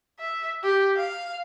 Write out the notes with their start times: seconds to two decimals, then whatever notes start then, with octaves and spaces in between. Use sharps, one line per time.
0.19 E5
0.63 G4
0.96 F5